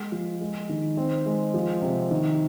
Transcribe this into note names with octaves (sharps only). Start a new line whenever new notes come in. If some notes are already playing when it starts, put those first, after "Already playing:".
Already playing: G#3
F3
G#3
D#3
C4
G#3
F3
C3
D#3